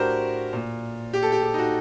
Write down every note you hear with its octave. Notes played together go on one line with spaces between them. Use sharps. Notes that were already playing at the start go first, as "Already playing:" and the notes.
Already playing: A2 D4 F#4 G4 A#4 C5
A#2
G4
A4
G4
G4
D#4
F#4